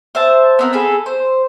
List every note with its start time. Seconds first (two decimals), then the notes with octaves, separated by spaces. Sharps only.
0.15 C5 E5 A5
0.59 B3 C4 A#4
0.73 G#4 A4 B5
1.06 C5